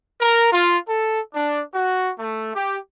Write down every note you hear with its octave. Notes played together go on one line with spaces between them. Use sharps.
A#4
F4
A4
D4
F#4
A3
G4